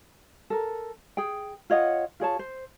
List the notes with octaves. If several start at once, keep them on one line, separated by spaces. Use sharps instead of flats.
A4 A#4
G#4 G5
F4 C#5 D#5 F#5
F4 G#4 C#5 A5
C5